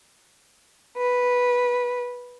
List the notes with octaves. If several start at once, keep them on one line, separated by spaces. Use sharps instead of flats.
B4